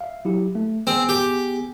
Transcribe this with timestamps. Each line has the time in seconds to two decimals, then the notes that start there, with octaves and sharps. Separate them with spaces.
0.01 E5 F5
0.25 F#3 E4 G4
0.55 A3
0.87 B3 C4 G#4 G#5
1.09 G4